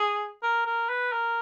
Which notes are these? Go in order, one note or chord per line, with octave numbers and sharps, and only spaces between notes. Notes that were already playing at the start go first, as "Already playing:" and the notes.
Already playing: G#4
A#4
A#4
B4
A#4